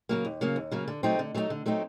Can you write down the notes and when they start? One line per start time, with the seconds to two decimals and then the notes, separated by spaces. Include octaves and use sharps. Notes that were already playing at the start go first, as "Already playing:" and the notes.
0.09 C#3 F#3 A#3
0.25 D#2
0.41 C#3 F#3 A#3
0.56 D#2
0.71 C#3 F#3 A#3
0.88 D3
1.03 F#3 A3 C4 D#4
1.19 D3
1.35 F#3 A3 C4 D#4
1.50 D3
1.66 F#3 A3 C4 D#4